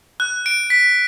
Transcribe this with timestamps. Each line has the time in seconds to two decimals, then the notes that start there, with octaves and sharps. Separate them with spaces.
0.20 F#6
0.46 D7
0.70 B6